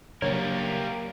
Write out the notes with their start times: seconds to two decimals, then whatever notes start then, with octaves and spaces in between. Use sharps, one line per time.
0.22 C#3 F#3 G3 A#3 D4 A#4 C#5